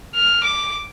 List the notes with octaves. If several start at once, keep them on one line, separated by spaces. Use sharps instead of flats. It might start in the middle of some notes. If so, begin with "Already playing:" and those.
F6
D6